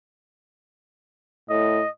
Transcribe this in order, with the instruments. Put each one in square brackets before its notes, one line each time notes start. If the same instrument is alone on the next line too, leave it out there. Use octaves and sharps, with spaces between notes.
[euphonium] A2 [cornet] D#5